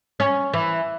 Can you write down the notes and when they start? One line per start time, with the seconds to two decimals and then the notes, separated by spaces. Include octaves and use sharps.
0.20 C#4
0.54 E3